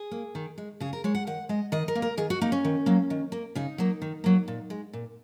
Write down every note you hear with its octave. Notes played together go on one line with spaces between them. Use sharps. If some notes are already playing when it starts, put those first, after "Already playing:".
Already playing: G#4
A#3
D#3
G#3
C#3 G#4
A#4
G#3 C#5
F#5
D#3 F#5
G#3 D#5
D#3 D#5
A#4
A#3
A#4
D#3 G#4
F#4
A#3 D#4
C#4
D#3
F#3 A#3
D#3
A#3
C#3 D#4
F#3 A#3
D#3
F#3 A#3
A#2
G#3
A#2